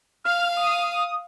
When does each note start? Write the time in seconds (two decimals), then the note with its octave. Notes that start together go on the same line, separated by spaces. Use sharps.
0.24 F5 F6
0.57 D#6